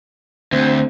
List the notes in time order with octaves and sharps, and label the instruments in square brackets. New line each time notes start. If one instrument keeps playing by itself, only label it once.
[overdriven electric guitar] D2 [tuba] C4